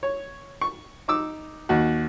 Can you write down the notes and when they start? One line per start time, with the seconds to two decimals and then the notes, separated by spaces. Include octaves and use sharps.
0.03 C#5
0.61 C#6
1.08 D#4 D6 E6
1.69 D#2 F#4